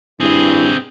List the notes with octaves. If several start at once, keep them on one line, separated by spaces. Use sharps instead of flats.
G2 C4 E4 G#4